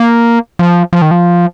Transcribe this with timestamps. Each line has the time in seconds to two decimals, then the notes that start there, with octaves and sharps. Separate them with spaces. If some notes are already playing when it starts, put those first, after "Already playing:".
Already playing: A#3
0.59 F3
0.93 F3
1.02 D#3
1.11 F3